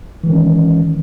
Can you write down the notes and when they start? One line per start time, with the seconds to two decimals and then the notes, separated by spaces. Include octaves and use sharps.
0.24 E3
0.27 G#3
0.30 D#3
0.33 C#4